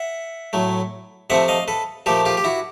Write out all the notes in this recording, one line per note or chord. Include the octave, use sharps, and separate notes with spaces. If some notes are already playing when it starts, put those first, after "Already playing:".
Already playing: E5 F#5
A2 F#3 A3
C3 F3 A3 C4 E5 F#5
D#5 F5
A4 B4
A#2 F3 A3 G4 A4
F4 G4
G4
E4 F#4